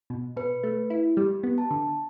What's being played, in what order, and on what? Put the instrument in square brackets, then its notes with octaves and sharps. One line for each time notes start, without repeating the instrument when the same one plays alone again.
[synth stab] B2
[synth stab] B2 [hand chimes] B4
[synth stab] A3
E4
[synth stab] G3 [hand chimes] G4
[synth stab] B3
[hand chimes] A5
[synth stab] D3